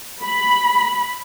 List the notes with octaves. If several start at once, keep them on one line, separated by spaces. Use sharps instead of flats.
B5